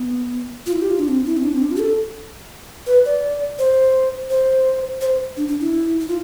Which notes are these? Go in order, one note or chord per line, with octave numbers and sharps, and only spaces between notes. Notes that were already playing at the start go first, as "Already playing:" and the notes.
Already playing: B3
F4
E4
G4
F4
D4
C4
E4
C4
D4
C4
D4
F4
G4
A4
B4
D5
C5
C5
C5
D4
D4
E4
E4
F4